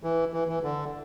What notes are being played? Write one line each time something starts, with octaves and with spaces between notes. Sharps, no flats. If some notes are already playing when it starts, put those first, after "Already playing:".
E3
E3
E3
D3